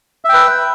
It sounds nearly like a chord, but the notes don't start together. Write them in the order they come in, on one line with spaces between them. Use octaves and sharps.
E5 G5 B4